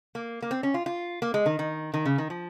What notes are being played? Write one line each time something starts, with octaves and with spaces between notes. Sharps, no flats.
A#3
A#3
C4
C#4
F4
F4
A#3
G#3
D#3
D#3
D#3
C#3
D#3
F3